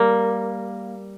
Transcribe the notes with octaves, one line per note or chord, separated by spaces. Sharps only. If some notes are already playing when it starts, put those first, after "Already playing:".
Already playing: G3 A#3